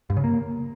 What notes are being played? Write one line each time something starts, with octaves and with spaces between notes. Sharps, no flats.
G2
C#3
A#3